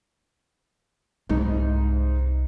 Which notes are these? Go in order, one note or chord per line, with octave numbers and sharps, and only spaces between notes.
C2 G#2 D#4